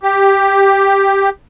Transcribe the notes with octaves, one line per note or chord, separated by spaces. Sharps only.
G4